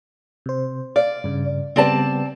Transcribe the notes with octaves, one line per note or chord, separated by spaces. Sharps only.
C3 C5
D5 F5
G2 C#3
C#3 G3 B3 C4 D5 A5